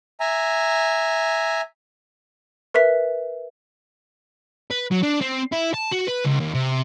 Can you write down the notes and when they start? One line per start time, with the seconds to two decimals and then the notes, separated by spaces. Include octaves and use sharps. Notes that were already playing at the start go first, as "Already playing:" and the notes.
0.20 E5 G#5 A#5
2.74 A#4 B4 E5 B6
4.71 B4
4.91 F#3
5.03 D4
5.21 C4
5.52 E4
5.74 A5
5.92 F#4
6.08 B4
6.25 C#2
6.40 D#2
6.54 C3